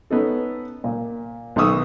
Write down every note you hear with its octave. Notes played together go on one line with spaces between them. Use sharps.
B3 C#4 D#4 A4
A#2
B1 D#3 B3 C#6 D#6 E6